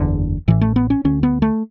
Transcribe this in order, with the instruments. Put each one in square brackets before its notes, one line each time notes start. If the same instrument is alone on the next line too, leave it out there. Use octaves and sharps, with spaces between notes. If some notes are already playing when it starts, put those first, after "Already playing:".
Already playing: [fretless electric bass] F#1 E2 D3
A1 A2 E3
A3
B3
C#4
D2 D3 C#4
B3
A3